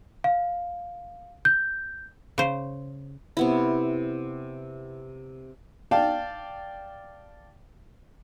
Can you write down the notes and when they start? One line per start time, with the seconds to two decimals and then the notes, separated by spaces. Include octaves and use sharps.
0.24 F5
1.45 G6
2.38 C#3 C5
3.37 C3 B3 E4
5.91 D5 F5 G5 A5